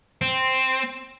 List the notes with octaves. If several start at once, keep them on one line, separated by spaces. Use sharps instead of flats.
C4